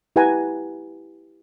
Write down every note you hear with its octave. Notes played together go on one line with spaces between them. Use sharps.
E4 G4 B4 F#5 G#5 A#5